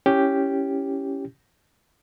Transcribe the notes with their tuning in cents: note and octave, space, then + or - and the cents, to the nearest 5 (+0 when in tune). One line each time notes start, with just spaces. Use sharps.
C#4 +0 E4 +0 G4 +0